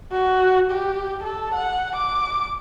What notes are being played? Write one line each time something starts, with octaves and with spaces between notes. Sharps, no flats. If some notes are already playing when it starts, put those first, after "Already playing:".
F#4
G4
A4
F#5
D6